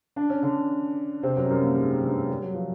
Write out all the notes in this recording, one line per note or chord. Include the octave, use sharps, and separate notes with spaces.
D4
C#4
D3 D4
C3 C4
F#2 F#3
G3
F#2 F#3
A#2 A#3
G#2 G#3
G2 G3
G3
F#3
F3